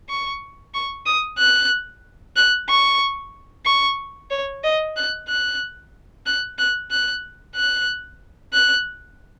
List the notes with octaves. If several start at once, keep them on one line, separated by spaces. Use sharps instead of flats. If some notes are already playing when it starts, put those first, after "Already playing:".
C#6
C#6
D#6
F#6
F#6
C#6
C#6
C#5
D#5
F#6
F#6
F#6
F#6
F#6
F#6
F#6